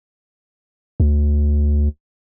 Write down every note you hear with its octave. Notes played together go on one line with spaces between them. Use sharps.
D2